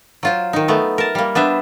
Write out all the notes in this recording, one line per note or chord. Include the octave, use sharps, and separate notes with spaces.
F#3 F4 C5
D#3 D#4
A3 B3
A#4 A5
G3 A#3
B3 D4 C5 E5